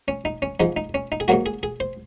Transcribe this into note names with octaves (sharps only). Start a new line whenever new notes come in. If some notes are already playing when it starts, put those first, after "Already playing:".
C#4
D#4
C#4
G#2 F3 G#3 D#4
D#4
C#4
D#4
G#4
G#2 F#3 A#3 F#4
G#4
G#4
C5